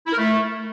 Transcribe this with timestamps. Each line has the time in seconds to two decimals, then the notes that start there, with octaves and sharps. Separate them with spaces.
0.07 E4
0.12 A#4
0.17 A3